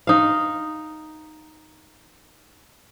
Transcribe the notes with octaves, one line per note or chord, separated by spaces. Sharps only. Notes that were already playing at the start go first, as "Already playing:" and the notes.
D#4 F5